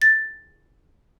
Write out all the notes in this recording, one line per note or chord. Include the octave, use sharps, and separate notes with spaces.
A6